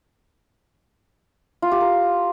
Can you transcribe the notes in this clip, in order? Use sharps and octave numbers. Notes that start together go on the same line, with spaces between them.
F4
G4
A#4